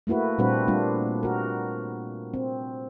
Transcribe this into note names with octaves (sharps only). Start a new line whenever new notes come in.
A3 A#3 E4 F#4 B4
A#2 G3 C4 D4 F#4 B4
G3 A#3 D4 F4
F#4 A#4
C4